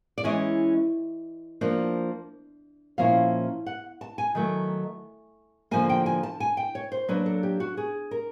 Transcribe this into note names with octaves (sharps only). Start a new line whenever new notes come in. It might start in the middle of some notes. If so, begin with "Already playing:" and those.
D5
E3 G#3 C#4 E4 D#5
F3 A#3 D4
A#2 F3 A#3 C#4 E4 F5
F#5
A5
G#5
D#3 F#3 A3
D3 F3 A#3 G#5
G5
G#5
A5
G#5
G5
C#5
C5
F#3 A#3 D4 B4
A4
G4
F#4
G#4
A#4